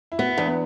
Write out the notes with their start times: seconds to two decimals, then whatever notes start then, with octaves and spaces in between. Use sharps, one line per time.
0.12 E4
0.18 B3 F#4
0.28 E4
0.37 E2 D4
0.47 B3